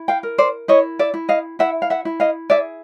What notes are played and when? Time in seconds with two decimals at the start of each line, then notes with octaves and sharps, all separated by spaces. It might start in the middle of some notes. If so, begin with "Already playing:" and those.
Already playing: E4
0.08 F5 G5
0.23 A#4
0.38 C5 D5
0.68 E4 C#5 D#5
0.99 D5 E5
1.14 E4
1.29 D#5 F5
1.59 E4 E5 F#5
1.82 F5
1.90 E5 F#5
2.05 E4
2.20 D#5 F5
2.50 G#4 D5 E5